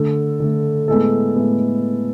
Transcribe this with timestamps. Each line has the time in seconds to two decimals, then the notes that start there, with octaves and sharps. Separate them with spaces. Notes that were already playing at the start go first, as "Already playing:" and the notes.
Already playing: D3 A3 A4
0.40 D3 A3
0.88 A2 G#3 B3 A4
1.36 A2 G#3 B3